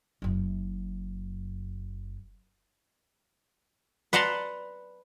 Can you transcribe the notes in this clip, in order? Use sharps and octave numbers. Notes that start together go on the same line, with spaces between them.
F#1 F#2
B4 D5 F#5 A5 A#5 C6